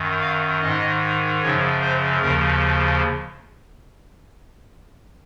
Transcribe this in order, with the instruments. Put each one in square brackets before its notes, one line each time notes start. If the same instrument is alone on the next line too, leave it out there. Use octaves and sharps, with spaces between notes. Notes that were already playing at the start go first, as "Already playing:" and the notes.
Already playing: [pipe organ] F#2 D#3
F5
G#2 D#3 D#5
F#2 C#3 F3 C#5
C5
D#2 C#3 F3 A#4